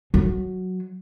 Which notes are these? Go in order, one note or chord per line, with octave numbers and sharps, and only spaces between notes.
F#3